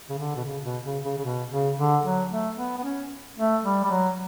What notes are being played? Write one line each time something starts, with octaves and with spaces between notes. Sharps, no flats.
C#3
D3
B2
C#3
B2
C#3
C#3
C#3
B2
C#3
D3
F#3
A3
B3
B3
C#4
A3
G3
G3
F#3